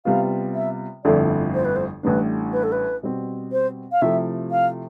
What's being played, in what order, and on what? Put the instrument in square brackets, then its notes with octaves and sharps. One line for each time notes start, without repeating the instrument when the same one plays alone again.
[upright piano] C3 G3 B3 F4 [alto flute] F5
[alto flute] E5
[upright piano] G1 F2 D3 A3 E4 [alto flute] D5
[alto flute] C5
B4
C5
[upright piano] A1 A2 G3 D4 [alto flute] B4
[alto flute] B4
A4
B4
[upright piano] B2 G3 C4
[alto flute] C5
F5
[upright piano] C3 F3 A3 E4 G4 [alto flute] E5
[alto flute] F5